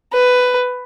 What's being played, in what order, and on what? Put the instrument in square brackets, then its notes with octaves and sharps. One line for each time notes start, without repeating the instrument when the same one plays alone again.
[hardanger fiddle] B4